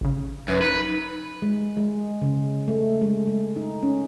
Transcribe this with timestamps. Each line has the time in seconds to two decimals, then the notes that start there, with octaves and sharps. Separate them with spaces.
0.01 A1 C#3
0.48 F#2 B4
0.62 D#4 B4
1.42 G#3
1.77 G#3
2.22 C#3
2.68 A3
3.01 G#3
3.27 G#3
3.56 D#4
3.83 C#4